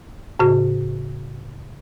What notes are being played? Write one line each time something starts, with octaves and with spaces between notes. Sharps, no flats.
A2 C#3 F#4